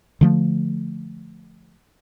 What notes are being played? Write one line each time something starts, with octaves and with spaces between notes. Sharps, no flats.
D3 F3 A3